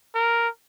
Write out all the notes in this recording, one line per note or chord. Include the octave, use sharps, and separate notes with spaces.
A#4